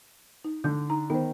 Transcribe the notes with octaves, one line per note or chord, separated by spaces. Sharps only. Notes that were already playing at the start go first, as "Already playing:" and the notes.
D#4
D3 G6
D#4 A#5
D#3 B3 C5